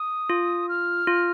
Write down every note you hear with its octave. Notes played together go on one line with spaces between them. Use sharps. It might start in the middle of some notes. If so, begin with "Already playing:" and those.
Already playing: D#6
F4
F6
F4